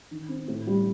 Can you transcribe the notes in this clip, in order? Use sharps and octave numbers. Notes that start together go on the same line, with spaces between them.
D#3
C4
A2
G3